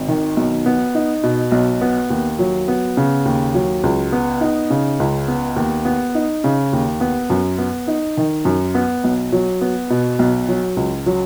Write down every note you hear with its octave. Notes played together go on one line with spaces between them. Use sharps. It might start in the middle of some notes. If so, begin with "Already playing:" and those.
Already playing: G#1
D#3
B1
B3
D#4
B2
B1
B3
D#2
F#3
B3
C#3
D#2
F#3
C#2
B3
D#4
C#3
C#2
B3
D#2
B3
D#4
C#3
D#2
B3
F#2
B3
D#4
D#3
F#2
B3
B1
F#3
B3
B2
B1
F#3
C#2
F#3